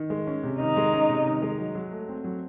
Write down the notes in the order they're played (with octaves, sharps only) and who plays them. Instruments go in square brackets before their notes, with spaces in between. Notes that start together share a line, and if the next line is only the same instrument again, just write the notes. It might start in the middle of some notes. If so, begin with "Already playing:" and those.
Already playing: [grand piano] D#3
G#3
C#4
C3
[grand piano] D#3 [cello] D#4
[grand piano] G#3
C#4
C3
D#3
G#3
F#3
F#3
A3
C4
F#3